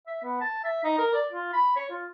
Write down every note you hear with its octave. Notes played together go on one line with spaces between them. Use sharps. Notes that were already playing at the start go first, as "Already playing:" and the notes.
E5
B3
A5
E5
D#4
A#4
D5
F4
B5
C#5
F4